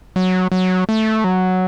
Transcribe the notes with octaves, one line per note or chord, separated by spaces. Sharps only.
F#3
F#3
A3
F#3